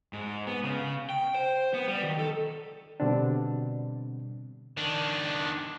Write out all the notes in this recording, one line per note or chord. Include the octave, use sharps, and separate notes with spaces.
G#2
B3
C#3
G5
C5
B3
G3
D#3
A4
B2 D3 G3 C4 D4
D#3 D4